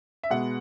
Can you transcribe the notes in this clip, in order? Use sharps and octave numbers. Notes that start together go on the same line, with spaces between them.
E5
B2 G#3 B3 F#5